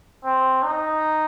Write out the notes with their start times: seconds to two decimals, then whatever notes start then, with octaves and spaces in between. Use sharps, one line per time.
0.25 C4
0.63 D#4